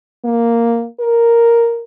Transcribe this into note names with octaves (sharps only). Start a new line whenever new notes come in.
A#3
A#4